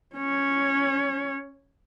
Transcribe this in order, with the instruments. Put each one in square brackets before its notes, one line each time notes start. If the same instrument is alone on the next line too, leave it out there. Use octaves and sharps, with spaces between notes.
[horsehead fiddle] C#4 C#5